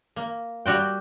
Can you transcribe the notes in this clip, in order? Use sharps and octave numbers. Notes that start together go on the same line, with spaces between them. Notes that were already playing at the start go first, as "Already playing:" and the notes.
A#3
G3 F#4 G5